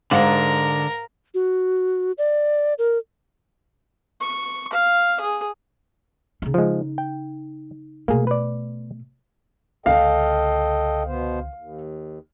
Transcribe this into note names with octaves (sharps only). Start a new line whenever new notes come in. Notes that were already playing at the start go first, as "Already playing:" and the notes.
G#2 D3 A#4 C5 F5 F#5
F#4
D5
A#4
C#6
F5
G#4
C#3 D#4
F3 G#3
G5
B2 A3 A#3 G#4
B4 D5
C#2 D3 A4 D#5 F5 G5
B2 B3 C5
D#2